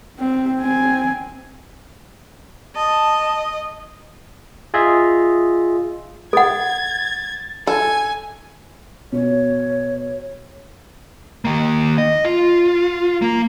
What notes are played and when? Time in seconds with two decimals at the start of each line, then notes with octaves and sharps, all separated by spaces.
0.19 C4
0.61 C4 G#5
2.76 D#5 A5
4.74 F4 G#4 D#5 E5
6.33 A4 F#5 G#6 A6
7.67 A4 G#5
9.12 B2 C#5
11.45 D#3 A#3
11.98 D#5
12.25 F4
13.22 A#3